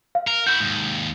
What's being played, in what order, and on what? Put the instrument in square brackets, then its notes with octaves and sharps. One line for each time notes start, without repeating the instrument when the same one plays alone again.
[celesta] F5
[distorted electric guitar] A#4
[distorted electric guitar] E4 F#4 [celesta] G6
[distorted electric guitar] D#2 G#2